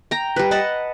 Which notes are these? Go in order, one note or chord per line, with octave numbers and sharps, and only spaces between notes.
G5 A#5
G3 B4
B4 D#5 F#5 A5